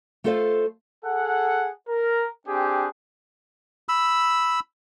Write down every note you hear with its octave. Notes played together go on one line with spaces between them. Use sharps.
A3 F4 A4 C5 D#5 F5
G#4 A4 F#5
A#4
C4 D4 G4 G#4
B5 E6